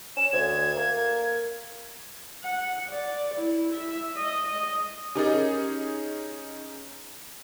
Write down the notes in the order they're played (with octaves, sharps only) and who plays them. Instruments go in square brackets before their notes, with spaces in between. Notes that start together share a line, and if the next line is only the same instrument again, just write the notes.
[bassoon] C#4 [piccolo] E7
[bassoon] D2 [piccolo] G#6
[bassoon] A#3
[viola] F#5
D5
E4
E5
D#5
D#5
[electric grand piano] C#4 D#4 G#4 [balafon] G4 A#4 D#5